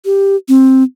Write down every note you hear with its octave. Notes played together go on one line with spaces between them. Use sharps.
G4
C4